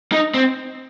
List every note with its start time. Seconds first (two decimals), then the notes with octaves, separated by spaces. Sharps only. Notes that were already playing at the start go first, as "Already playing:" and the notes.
0.12 D#4
0.34 C4